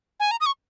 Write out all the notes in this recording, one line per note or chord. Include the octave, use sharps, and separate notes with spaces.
G#5
A#5
D#6
C#6